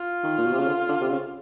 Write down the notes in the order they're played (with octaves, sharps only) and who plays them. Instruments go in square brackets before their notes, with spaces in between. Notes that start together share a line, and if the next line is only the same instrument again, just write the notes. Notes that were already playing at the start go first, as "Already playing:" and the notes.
Already playing: [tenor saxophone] F4
[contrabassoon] D#3
A#2
B2
C3
C#3
D3
D3
C3
C#3